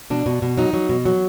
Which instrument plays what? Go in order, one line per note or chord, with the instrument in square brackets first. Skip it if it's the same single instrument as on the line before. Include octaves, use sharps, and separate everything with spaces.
[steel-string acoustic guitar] B2 D4
B2
B2
F#3 D#4
F#3
B2
F#3